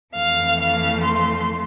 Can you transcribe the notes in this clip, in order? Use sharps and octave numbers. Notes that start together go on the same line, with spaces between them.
F2 E3 A3 F5
F5
C6